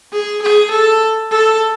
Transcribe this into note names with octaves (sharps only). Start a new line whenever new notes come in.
G#4
G#4
A4
A4